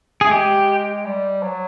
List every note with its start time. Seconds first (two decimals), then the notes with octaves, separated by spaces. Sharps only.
0.21 A3 G#4
0.31 G#3 G4
1.06 G3
1.43 F#3